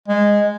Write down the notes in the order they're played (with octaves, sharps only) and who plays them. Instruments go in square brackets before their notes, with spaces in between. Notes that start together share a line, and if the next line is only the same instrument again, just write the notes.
[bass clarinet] G#3